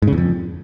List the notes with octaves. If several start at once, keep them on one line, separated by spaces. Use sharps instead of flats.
G#2
C#3
E2
F2